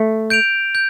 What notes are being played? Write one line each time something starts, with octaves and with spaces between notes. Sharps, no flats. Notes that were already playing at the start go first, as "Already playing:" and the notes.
Already playing: A3
G6 D7 F7
G6